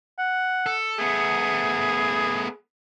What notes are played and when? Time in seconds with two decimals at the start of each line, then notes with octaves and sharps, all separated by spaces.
0.19 F#5
0.66 A4
0.98 A3 B3 G#4